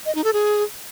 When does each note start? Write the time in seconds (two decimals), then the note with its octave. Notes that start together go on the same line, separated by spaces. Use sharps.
0.06 D#5
0.15 D#4
0.24 A4
0.33 G#4